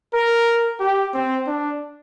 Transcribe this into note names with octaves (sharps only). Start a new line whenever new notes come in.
A#4
G4
C4
D4